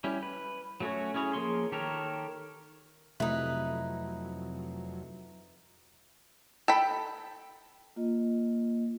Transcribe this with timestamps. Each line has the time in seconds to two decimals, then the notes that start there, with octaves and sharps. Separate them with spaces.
0.04 G3 C#4 E4
0.23 B4
0.80 F#3 A3 C#4 F#4 C#5
1.14 C#4 E4 G#4 C#5
1.34 F3 A#3 G#4 C#5 C6
1.72 D#3 G4 A4 A#4 C#5
3.20 F2 C3 F#3 A3 D#4 E4 B4
6.68 A4 G5 B5
7.96 A#3 F4 D#5